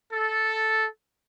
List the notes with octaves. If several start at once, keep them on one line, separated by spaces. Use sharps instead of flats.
A4